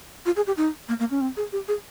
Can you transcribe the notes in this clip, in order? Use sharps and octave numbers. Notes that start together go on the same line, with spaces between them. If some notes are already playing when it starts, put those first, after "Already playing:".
F4
G#4
G4
D#4
A#3
A#3
C#4
C4
G#4
G4
G#4